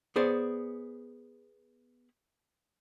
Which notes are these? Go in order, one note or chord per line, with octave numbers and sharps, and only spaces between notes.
B3 G#4 C5 D5